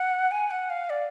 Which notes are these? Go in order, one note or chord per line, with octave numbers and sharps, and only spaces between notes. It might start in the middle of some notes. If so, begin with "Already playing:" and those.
Already playing: F#5
G#5
F#5
F5
D5